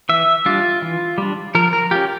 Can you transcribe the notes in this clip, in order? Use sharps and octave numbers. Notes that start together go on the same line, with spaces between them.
E3 E5
G3 D4 F4
E3
G3 D4
F3 A#4
A#4
C#4 F4 G4